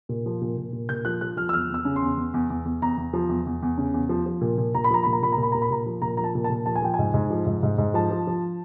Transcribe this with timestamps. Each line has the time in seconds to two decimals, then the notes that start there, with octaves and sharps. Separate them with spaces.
0.09 A#2
0.26 F3
0.42 A#2
0.57 A#2
0.73 A#2
0.89 A#2 G6
1.05 F3 F#6
1.21 F3 F#6
1.37 F3 F6
1.49 E6
1.53 E2 F6
1.70 E2 E6
1.85 C#3
1.96 C6
2.02 E2
2.17 E2
2.34 E2
2.50 E2
2.65 E2
2.82 E2 A#5
2.98 E2
3.13 F3
3.29 E2
3.46 E2
3.62 E2
3.78 C#3
3.94 E2
4.09 F3
4.26 F3
4.41 A#2
4.58 A#2
4.75 A#2 A#5
4.84 B5
4.91 F3 A#5
5.03 A#2 B5
5.13 A#5
5.23 A#2 B5
5.32 A#5
5.38 A#2
5.43 B5
5.52 A#2 A#5
5.62 B5
5.70 A#2 A#5
5.86 F3
6.02 A#2 A#5
6.17 F3 A#5
6.24 A5
6.35 A#2
6.44 A5
6.50 A#2
6.66 F3 A5
6.75 G#5
6.82 F3 G5
6.94 G#2 G#5
7.14 G#2
7.30 F3
7.46 G#2
7.63 G#2
7.78 G#2
7.94 F3 A5
8.11 F3
8.27 F3